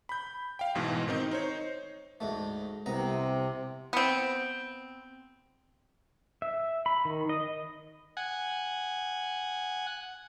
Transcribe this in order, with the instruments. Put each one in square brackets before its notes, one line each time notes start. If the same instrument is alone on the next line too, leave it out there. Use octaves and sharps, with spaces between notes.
[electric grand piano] B5 G6
F5 G5
A1 G#2 B2 E3
D#3 C4 D#4
D#4 C5 C#5
[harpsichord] D2 G#2 A3
[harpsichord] C2 B3 A#5 [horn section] C3
[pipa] B3 C4
[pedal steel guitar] E5
B5
D#3
D#5
[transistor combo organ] F#5 G#5